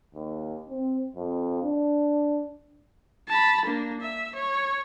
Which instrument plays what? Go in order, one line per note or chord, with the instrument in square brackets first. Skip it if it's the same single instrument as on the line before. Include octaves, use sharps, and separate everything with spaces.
[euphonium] D#2
C4
F2
D4
[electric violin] A5 B5
A#3 D4
E5
C#5